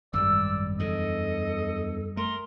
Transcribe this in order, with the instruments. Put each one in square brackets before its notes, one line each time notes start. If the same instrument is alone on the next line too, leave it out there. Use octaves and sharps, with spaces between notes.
[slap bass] G#1 [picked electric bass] F#2 G3 [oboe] D5 [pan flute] E6
[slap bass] E2 G2 D3 [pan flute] A4 [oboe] D#5
[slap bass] A3 [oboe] A#4 [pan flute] C6